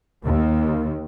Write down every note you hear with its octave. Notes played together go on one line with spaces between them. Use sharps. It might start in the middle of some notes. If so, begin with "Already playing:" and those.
D#2